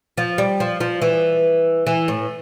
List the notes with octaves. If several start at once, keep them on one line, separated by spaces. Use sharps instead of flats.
F3
G3
F3
F3
E3
E3
A2